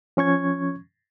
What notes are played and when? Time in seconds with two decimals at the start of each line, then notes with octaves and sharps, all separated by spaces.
0.17 F3 C#4 C#6 G#6